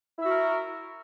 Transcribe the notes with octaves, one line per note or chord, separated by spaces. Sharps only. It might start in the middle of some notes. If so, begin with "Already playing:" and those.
E4 F#4 A#4 E5